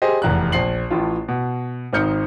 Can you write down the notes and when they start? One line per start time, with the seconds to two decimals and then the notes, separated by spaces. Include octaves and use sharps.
0.02 G4 G#4 C5 D#5
0.22 F1 E2 A#5 F#6
0.52 A#1 C7 F#7
0.90 A1 A2 F4
1.28 B2
1.93 G#1 C4 D#4 F6 G6 C#7